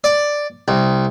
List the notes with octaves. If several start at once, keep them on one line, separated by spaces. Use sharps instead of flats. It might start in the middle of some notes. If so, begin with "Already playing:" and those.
D5
C2